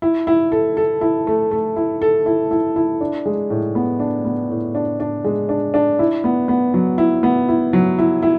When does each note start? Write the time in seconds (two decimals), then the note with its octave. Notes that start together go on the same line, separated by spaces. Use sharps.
0.02 E4
0.27 E4
0.52 A4
0.77 A4
1.01 E4
1.27 A3
1.51 A3
1.76 E4
2.02 A4
2.26 E4
2.51 E4
2.76 E4
3.01 D4
3.26 G#3
3.50 A2
3.75 B3
4.00 D4
4.25 B3
4.50 A2
4.75 D4
5.00 D4
5.24 G#3
5.49 D4
5.74 D4
5.99 E4
6.24 B3
6.48 B3
6.74 F#3
6.98 E4
7.23 B3
7.49 E4
7.73 F#3
7.99 E4
8.23 E4